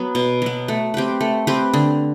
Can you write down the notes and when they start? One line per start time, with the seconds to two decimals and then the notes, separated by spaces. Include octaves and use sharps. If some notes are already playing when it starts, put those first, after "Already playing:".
Already playing: F#3 B3
0.15 B2
0.42 F#3 B3
0.68 A3
0.94 C4 G4 B4
1.21 A3
1.47 C4 G4 B4
1.74 D3